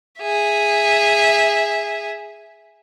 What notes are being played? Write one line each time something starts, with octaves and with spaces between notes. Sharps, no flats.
G#4 E5